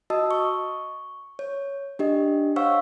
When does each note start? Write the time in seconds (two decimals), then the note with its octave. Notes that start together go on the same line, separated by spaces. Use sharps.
0.10 F#4 D#5 A5 D#6 E6
0.31 C#6
1.39 C#5
1.99 D4 G4 D#5
2.56 C5 C#5 F5 F#5 C#6 E6